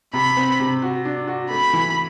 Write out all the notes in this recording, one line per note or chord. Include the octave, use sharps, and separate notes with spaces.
C3 B5
C4
C3
F#4
D4
F#4
A3 B5
E3